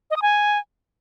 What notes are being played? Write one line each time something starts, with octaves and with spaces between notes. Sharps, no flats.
D#5
D#6
G#5